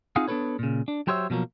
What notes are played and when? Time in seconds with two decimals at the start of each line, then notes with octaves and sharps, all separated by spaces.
0.16 C4 D#4 F4 G#4 F5 F#5
0.28 B3 D4 F4 A4 B4 C#5
0.59 A#2 C#3
0.88 D4
1.07 F#3 G4 C5 C#5 D#5 E5
1.30 B2 F3 F#3 A#3